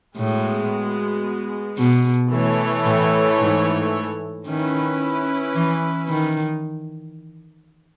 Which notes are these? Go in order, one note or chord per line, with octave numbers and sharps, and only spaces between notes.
A2 G#3 B3 F#4
B2
E3 A3 E4 A4 C#5
A2
G#2
D#3 C#4 E4 B4
E3
D#3